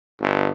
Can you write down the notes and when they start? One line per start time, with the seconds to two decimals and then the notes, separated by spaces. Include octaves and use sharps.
0.21 G1